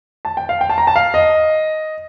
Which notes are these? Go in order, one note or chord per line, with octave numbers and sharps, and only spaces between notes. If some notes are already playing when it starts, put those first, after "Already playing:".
A5
G5
F5
G5
A5
A#5
A5
F5
D#5